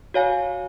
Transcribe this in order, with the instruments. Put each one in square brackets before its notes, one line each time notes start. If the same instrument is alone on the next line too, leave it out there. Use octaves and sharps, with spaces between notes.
[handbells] F#4 C#5 F5 G#5